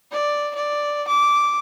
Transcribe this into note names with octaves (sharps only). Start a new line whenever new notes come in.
D5
D5
D6